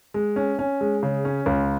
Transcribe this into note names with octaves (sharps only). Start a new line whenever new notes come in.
G#3
C#4
C#4
G#3
C#3
C#4
C#2